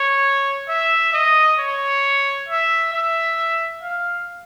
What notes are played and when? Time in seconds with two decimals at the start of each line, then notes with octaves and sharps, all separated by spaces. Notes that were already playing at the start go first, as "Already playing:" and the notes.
Already playing: C#5
0.68 E5
1.13 D#5
1.59 C#5
2.48 E5
2.93 E5
3.82 F5